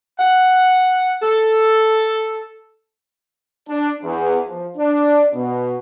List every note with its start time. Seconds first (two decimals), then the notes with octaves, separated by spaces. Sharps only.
0.19 F#5
1.21 A4
3.68 D4
4.03 E2
4.46 F3
4.77 D4
5.33 B2